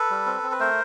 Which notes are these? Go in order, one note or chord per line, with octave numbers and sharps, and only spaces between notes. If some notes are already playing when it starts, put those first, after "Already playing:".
Already playing: A4 B4
G3
C4
C4
B4
A3 A#4 C5